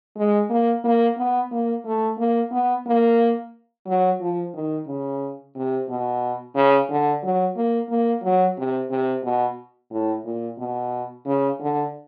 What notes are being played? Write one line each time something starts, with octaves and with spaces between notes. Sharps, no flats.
G#3
A#3
A#3
B3
A#3
A3
A#3
B3
A#3
F#3
F3
D#3
C#3
C3
B2
C#3
D3
F#3
A#3
A#3
F#3
C3
C3
B2
A2
A#2
B2
C#3
D3